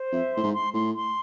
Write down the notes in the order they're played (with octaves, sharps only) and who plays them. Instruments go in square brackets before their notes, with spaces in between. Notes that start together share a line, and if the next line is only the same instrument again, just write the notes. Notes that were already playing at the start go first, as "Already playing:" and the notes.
Already playing: [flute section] C5
[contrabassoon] F2 [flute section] E5
[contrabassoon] A2 [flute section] C6
[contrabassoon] G#2
[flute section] C6
[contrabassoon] A2 [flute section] C6
[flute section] C6